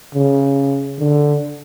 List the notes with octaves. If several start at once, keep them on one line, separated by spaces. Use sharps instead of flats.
C#3
D3